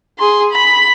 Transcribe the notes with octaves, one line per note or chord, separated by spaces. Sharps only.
G#4 C6
B5